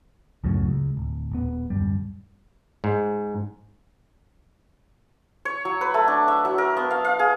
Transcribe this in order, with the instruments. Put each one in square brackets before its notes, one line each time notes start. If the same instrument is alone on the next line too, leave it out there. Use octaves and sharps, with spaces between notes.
[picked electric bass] C#2 F#2 A2 F#3
C#2
D1
D#1 B3
D1 G1 F#2 G3
[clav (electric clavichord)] G#2
[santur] C#5
F#3
B4
A3
D4
E5
F#3
A#4
B3
F5
F5
G#4